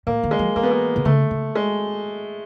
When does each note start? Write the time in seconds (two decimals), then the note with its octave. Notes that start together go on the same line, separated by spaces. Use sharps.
0.07 A2 A#3
0.23 D#3
0.31 G#3
0.39 F3
0.56 E3 A#3
0.63 B3
0.71 A#3
0.96 C3
1.05 C#3 A3
1.31 C#3
1.55 G#3